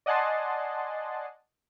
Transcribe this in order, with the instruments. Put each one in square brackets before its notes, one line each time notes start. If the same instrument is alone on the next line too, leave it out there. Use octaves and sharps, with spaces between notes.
[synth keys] D5 D#5 F#5 G#5 A5 C6